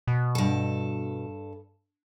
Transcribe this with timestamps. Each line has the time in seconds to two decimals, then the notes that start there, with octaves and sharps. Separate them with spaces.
0.07 B2
0.35 G2 A4